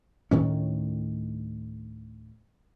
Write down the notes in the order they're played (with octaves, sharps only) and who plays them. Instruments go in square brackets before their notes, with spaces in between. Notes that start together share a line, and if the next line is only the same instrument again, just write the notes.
[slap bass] D2 A2 D#3 C#4